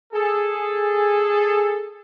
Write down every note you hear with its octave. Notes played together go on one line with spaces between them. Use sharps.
G#4 A4